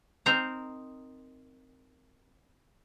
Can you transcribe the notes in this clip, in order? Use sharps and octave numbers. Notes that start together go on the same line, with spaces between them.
C4 D#4 A#4 C5 A#5